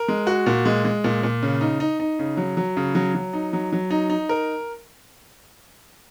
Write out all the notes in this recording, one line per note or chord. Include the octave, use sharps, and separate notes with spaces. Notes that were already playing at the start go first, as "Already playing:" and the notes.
Already playing: A#4
G#3
F#4
A#2
G#3
G#3
A#2
A#2
C#3
D#4
D#4
D#4
C#3
F#3
F#3
C#3
F#3
F#3
D#4
F#3
F#3
D#4
D#4
A#4